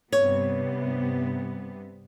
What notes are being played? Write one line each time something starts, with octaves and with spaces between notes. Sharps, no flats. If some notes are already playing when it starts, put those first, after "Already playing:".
G2 C3 B3 C#5